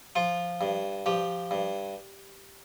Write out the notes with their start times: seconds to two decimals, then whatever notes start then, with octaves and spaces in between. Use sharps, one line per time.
0.16 F3 F4
0.61 G2
1.06 F3 G4
1.51 G2